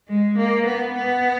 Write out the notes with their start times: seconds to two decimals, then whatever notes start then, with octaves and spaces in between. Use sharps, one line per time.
0.08 G#3
0.37 A#3
0.66 B3
0.94 B3